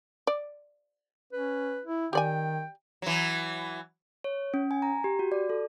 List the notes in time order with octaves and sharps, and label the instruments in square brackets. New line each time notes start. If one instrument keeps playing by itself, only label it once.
[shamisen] D5
[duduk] C#4 [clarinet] B4
[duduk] E4
[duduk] D#3 [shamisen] G4 D5 G#5 [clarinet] G5
[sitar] E3 F#3
[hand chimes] C#5
C#4
G#5
A#5
G4
F#4
D5
A4